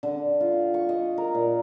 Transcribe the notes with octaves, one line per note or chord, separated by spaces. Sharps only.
D3
F4
C#6
D#5
A#4
A#2